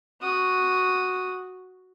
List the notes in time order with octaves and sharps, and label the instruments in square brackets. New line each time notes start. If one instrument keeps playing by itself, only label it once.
[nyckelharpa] F#4 D#6